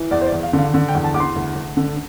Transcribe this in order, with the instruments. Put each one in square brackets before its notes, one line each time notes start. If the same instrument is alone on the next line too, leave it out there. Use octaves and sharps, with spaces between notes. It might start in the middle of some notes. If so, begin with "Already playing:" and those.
Already playing: [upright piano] E3
E2 D5
C5
D5
E2
F5
D3
F5
D3
G5
E2
A5
E2 D6
C6
D2
D2
D3